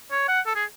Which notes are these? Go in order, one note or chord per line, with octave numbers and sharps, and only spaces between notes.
C#5
F#5
A4
G#4